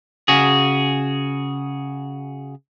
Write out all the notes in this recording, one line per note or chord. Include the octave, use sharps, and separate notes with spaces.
C#3 F#4 G#4